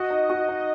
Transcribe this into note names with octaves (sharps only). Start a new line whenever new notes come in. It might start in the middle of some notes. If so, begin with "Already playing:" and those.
Already playing: F#4 D#5
D#4
F#4
D#4